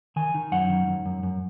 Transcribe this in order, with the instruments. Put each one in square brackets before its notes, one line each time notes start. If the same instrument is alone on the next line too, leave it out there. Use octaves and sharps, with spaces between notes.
[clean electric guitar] D#3 G#5
D#3
F#2 F#5
D#3
F#2
F#2
F#2